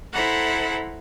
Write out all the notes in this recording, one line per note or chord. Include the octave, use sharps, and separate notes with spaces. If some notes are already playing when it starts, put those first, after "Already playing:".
E4 A4 C5 F#5 A#5 B5